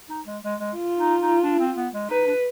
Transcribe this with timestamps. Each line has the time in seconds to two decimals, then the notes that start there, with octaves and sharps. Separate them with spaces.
0.09 D#4
0.26 G#3
0.44 G#3
0.60 G#3
0.77 F4
0.99 D#4
1.21 D#4
1.43 D4
1.59 C4
1.77 B3
1.93 G#3
2.10 D#4 B4
2.27 D4